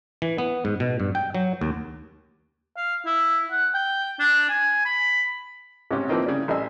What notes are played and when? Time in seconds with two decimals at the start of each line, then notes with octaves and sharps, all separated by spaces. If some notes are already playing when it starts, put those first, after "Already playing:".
0.22 E3
0.38 B3
0.65 G#2
0.80 B2
1.00 G2
1.15 G5
1.35 F#3
1.61 D#2
2.77 F5
3.06 E4
3.52 F#5
3.74 G5
4.19 D4
4.49 G#5
4.85 B5
5.91 G#2 C3 C#4 G4
6.09 E3 F3 A#3 C4 D#4
6.26 C#3 G3
6.48 A1 G3 D#5 G#5 E6